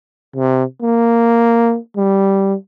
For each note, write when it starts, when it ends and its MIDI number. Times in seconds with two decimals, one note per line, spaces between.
0.36 0.64 48
0.82 1.77 58
1.97 2.54 55